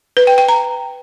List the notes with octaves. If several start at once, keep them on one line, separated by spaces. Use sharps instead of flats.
B4
G5
G5
A#5